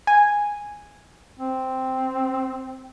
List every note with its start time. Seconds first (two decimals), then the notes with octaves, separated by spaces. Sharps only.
0.07 G#5
1.40 C4